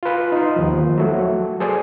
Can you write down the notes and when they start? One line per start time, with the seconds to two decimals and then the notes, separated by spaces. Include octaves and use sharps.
0.03 F4 B4
0.32 D#4 C6
0.56 D#2 F3
0.98 F#3 A3
1.60 G#4 A4 C5 D5 G#5